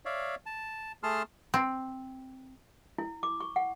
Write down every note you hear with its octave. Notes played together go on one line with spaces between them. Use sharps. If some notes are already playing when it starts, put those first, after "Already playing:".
C#5 D5 E5 F5
A5
A3 G#4 A5 C6 F6
C4
E4
D6
C#6
F#5